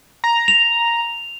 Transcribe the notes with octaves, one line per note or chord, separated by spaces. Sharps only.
A#5
F7